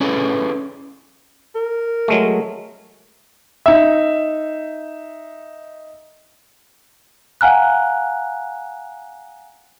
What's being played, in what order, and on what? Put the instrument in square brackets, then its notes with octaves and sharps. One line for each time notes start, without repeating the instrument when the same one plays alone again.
[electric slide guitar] C#4 D4 E4 G#4 A4 B4
[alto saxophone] A#4
[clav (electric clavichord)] F#3 G#3 A3
[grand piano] D#4 E5
[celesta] F5 F#5 G#5 A#5 F6 F#6